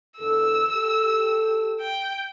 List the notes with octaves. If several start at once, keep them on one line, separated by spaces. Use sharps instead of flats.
E2 D3 A4 E6
G4 A4
G5